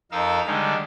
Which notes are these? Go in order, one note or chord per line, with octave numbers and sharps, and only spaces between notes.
F2 D#4 A#4 F5 E6
D3 D#3 G3 G#3